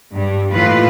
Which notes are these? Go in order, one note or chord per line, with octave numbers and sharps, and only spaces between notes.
G2 G3
D#2 A2 E3 F4 B4